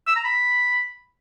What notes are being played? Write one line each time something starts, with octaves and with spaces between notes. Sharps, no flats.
E6
A#5
B5